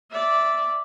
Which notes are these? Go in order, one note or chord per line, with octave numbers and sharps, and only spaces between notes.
D5 E5